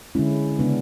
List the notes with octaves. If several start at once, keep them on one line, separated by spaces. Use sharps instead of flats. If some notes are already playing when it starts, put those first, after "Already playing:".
D3 G#3 C#4 E4
C#3 G#3 B3 D4